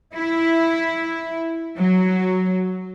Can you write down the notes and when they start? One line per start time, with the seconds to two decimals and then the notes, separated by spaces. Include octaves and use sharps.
0.15 E4
1.79 F#3